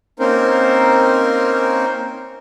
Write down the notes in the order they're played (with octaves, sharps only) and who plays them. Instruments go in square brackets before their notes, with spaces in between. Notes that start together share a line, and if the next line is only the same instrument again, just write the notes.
[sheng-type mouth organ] A#3 C4 C#4 D#4 A#4 C5